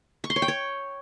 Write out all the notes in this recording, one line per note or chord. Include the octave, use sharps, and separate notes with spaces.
C#6
C6
C#5
G5
C#5